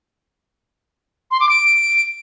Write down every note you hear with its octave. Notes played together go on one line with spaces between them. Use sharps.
C6
D6
D7